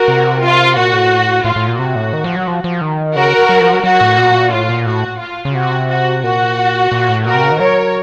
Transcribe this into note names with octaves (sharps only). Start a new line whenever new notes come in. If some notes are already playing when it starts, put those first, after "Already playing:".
Already playing: F#4 A#4
C3
F4
A#2 F#4
A2
A2 F4
A2
A#2
C3 F#4
A2
D#3
F3
F#3
F3
F3
D#3
C#3 F#4 A#4
F#3
F3
F#3
F#3 F#4
A2
A#2
A2 F4
A#2
A2 F#4
F4
C#3
C3 F#4
F#4
A#2 F#4
A#2
A2
A#2 F#4 A#4
C3
C#3
D#3
F#3 A#4 C#5